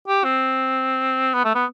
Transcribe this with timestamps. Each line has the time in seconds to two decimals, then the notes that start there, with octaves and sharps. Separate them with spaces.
0.08 G4
0.24 C4
1.34 B3
1.45 A3
1.55 B3